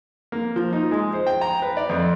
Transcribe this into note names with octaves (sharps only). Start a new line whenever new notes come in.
A#3
F3
D#4
G#3
C5
G5
A#5
B4
D5
F2